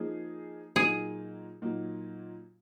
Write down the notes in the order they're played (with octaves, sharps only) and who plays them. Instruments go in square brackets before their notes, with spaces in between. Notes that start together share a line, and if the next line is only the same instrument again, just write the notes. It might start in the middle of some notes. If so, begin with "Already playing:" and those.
Already playing: [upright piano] F3 A#3 D#4 G#4
[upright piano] A#2 F#3 A#3 D#4 [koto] G#4
[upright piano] A#2 F#3 A#3 D#4